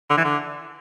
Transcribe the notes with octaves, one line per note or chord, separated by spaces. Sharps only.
D3
E3
D3